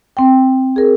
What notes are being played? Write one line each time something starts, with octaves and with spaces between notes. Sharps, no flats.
C4 G5
G#4 A#4